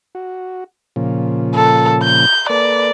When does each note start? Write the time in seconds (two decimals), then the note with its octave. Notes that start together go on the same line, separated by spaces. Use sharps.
0.15 F#4
0.96 A#2 C#3 F3
1.55 A4
2.03 G6
2.50 A#3 A4 B4 D5